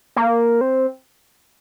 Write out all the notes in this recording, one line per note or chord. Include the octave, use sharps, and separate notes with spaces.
A#3
C4